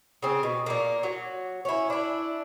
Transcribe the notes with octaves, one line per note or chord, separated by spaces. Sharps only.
C#3 C4
B2
A#2 A#3
F#3
C#4 E4
D4 E4